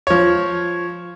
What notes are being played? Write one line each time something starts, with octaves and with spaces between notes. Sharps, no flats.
F3 C#5